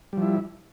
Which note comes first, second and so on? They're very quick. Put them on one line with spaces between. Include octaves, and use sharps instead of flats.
G3 F3 E4